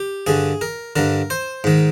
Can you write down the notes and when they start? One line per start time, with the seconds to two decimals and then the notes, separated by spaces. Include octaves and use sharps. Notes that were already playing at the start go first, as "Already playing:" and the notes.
Already playing: G4
0.27 G2 D3 G#4
0.61 A#4
0.96 G2 D3 A#4
1.30 C5
1.64 G#2 D#3